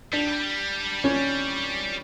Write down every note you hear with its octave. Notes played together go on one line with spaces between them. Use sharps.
G3 D4
C#4